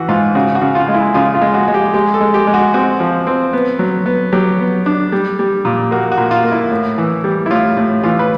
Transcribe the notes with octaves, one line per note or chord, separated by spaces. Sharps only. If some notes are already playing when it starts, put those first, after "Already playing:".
Already playing: E3 F#4
G#2 F4
C#3 F#4
F#4
C#3
F4
G#3
E4
C#3 F4
F4
G#3
F#4
G#3
G4
G#3 G4
A4
G#3
G4
G#3
F#4
C4 F#4
F3
C4
B3
F#3
B3
F#3 G4
B3
D4
G3
G3
A#2
A#3 F#4
F#4
A#2
F4
A#3
E4
A2
E3
G3
E4
A2 F4
A2
E3 F4
B4